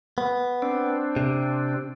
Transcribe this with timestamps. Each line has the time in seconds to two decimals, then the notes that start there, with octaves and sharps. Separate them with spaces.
0.18 B3
0.62 C4 D4
1.16 C3